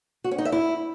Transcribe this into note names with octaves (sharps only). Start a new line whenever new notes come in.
F#4
C#4
D#4
E5
E4